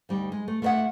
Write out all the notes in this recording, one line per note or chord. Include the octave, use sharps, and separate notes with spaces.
D2 G3 D#4
G#3
A3
A3 F4 B4 D#5 E5 F#5